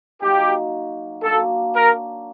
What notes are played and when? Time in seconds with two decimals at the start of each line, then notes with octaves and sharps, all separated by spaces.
0.21 F#3 A#3 D#4 G4
1.23 F#3 A#3 D4 A4
1.75 A#4